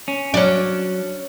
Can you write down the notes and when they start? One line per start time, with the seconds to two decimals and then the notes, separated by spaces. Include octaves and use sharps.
0.08 C#4
0.34 F#3 C#4 D4 D5